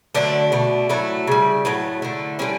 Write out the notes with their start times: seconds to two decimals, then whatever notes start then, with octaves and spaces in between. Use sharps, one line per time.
0.15 D3 F#3 A3 D4
0.52 B2 A3
0.89 A2 F#3 A3 E4
1.27 C#3 G3
1.65 A2 F#3 A3
2.02 D3 A3
2.39 D3 G3 C#4